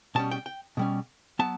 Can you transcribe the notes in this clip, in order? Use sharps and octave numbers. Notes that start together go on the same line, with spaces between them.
B2 G3 C#4 A5
G5
G5
B2 G3 C#4
F#3 B3 A5